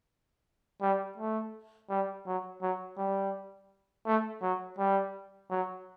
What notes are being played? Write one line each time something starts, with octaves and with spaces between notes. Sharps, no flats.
G3
A3
G3
F#3
F#3
G3
A3
F#3
G3
F#3